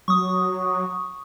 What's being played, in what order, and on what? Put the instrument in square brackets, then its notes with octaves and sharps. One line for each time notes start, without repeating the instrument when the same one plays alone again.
[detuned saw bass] F#3 [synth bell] C#6 D#6